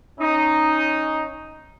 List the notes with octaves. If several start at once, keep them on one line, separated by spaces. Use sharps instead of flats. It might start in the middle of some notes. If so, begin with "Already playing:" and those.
C#4 D#4